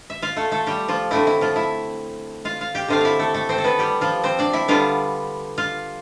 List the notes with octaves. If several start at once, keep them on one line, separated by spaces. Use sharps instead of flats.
E5
F4 F5
A3 A4
A3 A4
G3 G4
F3 F4
D3 A3 C4 E4
E4
F3 F4
E4 E5
F4 F5
F4 F5
G4 G5
D3 A3 C4 F4 F5
E4 E5 F5
A3 A4
A3 A4
C4 C5
A4
B3 B4
G3 G4
F3 F4
C4 C5
D4 D5
E4 E5
D3 G3 B3 F4 F5
F4 F5